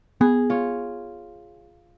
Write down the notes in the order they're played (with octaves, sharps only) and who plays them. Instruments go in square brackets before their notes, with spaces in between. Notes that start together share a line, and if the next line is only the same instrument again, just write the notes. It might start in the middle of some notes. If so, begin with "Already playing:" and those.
[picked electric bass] B3 [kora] G#4
[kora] F4 C#5